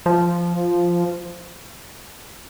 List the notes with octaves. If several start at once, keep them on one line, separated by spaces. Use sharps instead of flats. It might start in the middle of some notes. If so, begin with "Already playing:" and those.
F3